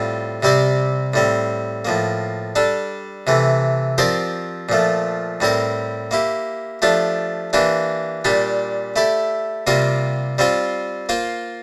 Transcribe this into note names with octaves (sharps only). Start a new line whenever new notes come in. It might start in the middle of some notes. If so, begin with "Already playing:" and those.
Already playing: A2 G3 C4 F4 A4
C3 G3 C4 G4 D5
A2 G3 C4
A2 F3 A#3
G3 D4 A4
C3 E3 A3
F3 C4 G4 A#4 D5
A#2 F3 A3
A2 G3 C4 G4 A#4
A#3 E4 G4
F3 A3 D4 G4
E3 A#3 D4 G4
A#2 G3 D4 G4
A3 E4 G4 D5
C3 G3 A#3 F4 A#4
G3 C4 F4 C5
A#3 F4 C5